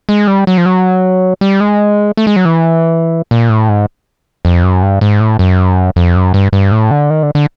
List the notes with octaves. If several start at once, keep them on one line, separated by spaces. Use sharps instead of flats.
G#3
G3
F#3
F3
F#3
G3
G#3
A3
G#3
F#3
E3
A#2
A2
G#2
F2
F#2
G2
G#2
A2
F#2
F2
F#2
G2
G2
A2
D3
D#3
D3
D3